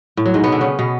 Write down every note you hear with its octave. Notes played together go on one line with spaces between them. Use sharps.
A2
F#3
G#2 G#3
B2 B3
D3 D4
C#3 C#4
B2 B3